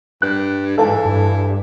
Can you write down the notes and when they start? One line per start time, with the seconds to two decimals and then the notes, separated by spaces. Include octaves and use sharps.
0.22 G2 F#6
0.77 G#2 E3 A4 F5 A5
1.05 G2